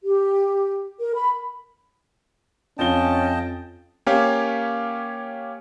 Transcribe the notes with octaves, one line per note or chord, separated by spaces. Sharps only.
G4
A#4
B5
F2 C#4 F4 D#5 G5 A5 G7
A#3 C#4 G4 C#5 F5 G#5